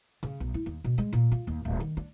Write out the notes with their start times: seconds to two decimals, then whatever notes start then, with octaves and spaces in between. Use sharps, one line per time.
0.23 C#3
0.40 B1
0.54 E4
0.66 D#2
0.84 B2
0.98 G#3
1.13 A#2
1.32 F4
1.47 D#2
1.65 D1
1.80 D#3
1.97 D4